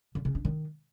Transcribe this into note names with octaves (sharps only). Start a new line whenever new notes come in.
D3
C#3
D4
D#3